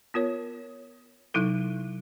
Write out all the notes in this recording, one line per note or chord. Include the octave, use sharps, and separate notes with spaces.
B3 F4 A#4 C#5
C3 F#3 D#4 E4 A4